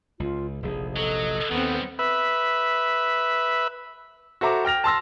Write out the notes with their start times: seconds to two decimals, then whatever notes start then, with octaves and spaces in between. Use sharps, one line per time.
0.20 C#2 F4
0.62 F1 A#1 G#4
0.96 F#3 A4 D#5
1.51 D#2 D#3 G3 B3 C4
1.99 B4 E5
4.41 F#4 A4 C5 E5 A#5 D6
4.65 G5 F6 A#6 F7
4.84 A5 C6 E6 A#6